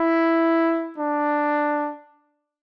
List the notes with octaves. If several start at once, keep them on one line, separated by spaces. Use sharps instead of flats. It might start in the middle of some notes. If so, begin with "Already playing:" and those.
Already playing: E4
D4